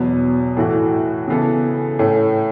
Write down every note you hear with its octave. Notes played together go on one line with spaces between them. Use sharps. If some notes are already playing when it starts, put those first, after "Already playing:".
Already playing: E2 B2 F#3 B3
A2 E3 A3 F#4
C#3 E3 B3 A4
A2 A3 C#4